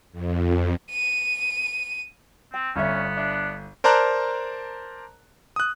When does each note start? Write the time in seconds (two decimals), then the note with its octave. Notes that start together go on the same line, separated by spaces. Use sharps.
0.12 F2
0.91 D#7
2.54 C4 G5
2.76 G1 B3 C#4 D5 E5
3.17 D4 E5
3.84 A#4 C5 D5 A5 A#5 F#6
5.56 D#6 F#6